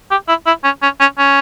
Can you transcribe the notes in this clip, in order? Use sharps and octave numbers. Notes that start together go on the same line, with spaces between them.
G4
E4
E4
C#4
C#4
C#4
C#4